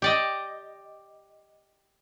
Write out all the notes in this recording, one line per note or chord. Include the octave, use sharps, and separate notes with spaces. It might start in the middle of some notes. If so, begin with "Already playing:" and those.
G4 D5 D#5